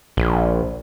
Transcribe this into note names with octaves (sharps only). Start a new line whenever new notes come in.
A#1